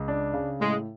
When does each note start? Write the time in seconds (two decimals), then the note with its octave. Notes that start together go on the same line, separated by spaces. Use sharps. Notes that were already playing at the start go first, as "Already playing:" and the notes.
Already playing: C#2
0.08 D4
0.34 C#3
0.60 A2 G#3